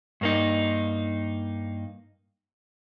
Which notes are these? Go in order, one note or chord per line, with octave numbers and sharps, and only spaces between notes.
G2 A#3 D#4